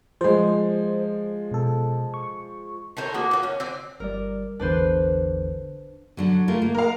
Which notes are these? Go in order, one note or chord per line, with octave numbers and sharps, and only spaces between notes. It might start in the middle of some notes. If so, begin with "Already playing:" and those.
F3 G#3 C5
B2 A4
C#6
A4 A#4 C5 C#5
A#3 B3 F#4
A#3 F#4
C#4
C4 D5
G1 G3 A#4 D5
A1 E2 D3 D4 B4 C5
D3 F#3 D4
A3 F4 A#4
A#3
A#4 F5